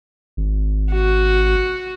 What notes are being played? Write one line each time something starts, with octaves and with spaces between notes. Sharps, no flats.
G#1
F#4